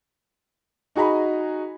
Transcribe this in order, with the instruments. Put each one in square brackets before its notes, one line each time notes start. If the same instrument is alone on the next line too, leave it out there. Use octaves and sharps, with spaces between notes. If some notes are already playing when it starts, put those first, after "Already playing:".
[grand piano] D#4 F#4 G#4 D#5 A#5 B5